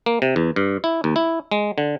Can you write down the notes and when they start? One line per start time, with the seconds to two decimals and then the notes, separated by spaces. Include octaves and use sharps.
0.06 A#3
0.22 C3
0.36 E2
0.56 G2
0.84 E4
1.04 D#2
1.16 E4
1.52 G#3
1.78 D3